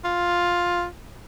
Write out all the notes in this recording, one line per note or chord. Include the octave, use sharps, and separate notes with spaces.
F4